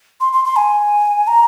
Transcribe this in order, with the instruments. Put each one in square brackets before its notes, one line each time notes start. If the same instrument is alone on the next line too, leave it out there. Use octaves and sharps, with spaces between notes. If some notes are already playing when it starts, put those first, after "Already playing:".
[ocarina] C6
C6
C6
G#5
A#5